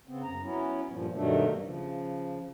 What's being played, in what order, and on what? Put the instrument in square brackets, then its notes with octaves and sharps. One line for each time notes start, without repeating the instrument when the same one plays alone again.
[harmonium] C#3 B3 C4
F#2 A#5
F#3 B3 C#4 E4
G2 A#2 F3
G2 B2 D#3 F#3 A3 D4
C#3 F3